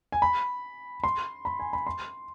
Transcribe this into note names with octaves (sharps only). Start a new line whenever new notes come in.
G#5
B5
C6
B5
G#5
B5
C6